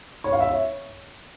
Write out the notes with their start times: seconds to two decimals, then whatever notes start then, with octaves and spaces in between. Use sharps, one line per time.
0.24 C#5
0.32 F5
0.41 E5
0.49 C#5